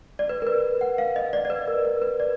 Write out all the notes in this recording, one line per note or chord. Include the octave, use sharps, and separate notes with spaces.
D5
B4
A#4
B4
F#5
F5
D#5
D5
D5
B4
A#4
A#4
B4
D5